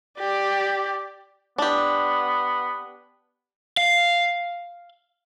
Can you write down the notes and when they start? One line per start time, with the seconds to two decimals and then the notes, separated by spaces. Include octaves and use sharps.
0.18 G4 D5
1.58 B3 D4 G4
3.77 F5